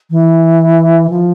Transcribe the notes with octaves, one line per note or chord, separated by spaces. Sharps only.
E3
F3